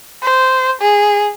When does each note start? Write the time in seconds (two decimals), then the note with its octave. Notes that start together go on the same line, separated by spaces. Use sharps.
0.22 C5
0.81 G#4